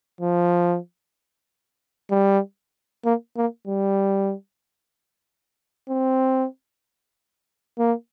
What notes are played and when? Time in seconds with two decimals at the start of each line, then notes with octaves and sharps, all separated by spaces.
0.21 F3
2.11 G3
3.05 A#3
3.37 A#3
3.67 G3
5.89 C4
7.78 A#3